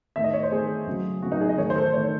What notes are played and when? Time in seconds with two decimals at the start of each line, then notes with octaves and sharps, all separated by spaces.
0.16 D#3 A3 E5
0.24 D#5
0.33 C#5
0.43 C5
0.51 D#3 A3 G#4
0.86 C#3 F#3 A3
1.22 C#3 F#3 A3 F#4
1.32 D#4
1.41 G#4
1.49 D#5
1.58 D#3 A3 C#5
1.70 C5
1.76 A4
1.82 C5
1.93 D#3 A3 C#5